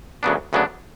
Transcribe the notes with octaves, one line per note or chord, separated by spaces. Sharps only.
D2 C#3 F#3 B3 D4
D2 C#3 F#3 B3 D4